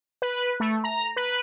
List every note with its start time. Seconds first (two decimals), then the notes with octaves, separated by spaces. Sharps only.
0.22 B4
0.60 A3
0.84 A#5
1.16 B4